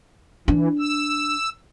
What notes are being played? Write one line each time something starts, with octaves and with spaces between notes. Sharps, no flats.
E3 D4
E6